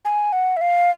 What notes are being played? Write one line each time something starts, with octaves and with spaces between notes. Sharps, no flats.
G#5
F#5
E5
F5